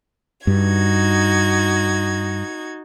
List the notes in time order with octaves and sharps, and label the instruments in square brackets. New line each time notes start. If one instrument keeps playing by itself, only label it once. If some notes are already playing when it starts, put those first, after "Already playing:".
[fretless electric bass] G2 [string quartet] D#4 F#4 G#6